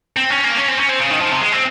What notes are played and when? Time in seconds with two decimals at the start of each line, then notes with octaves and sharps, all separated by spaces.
0.17 C4
0.30 C#4
0.44 A#3
0.58 C#4
0.69 C4
0.80 C#4
0.89 C4
1.00 C#3
1.11 D#3
1.20 F3
1.32 C3
1.41 G#3
1.52 C4